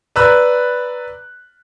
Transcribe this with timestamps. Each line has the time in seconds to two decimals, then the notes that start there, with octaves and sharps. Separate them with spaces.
0.16 B4 D5 A#5 B5 E6 F#6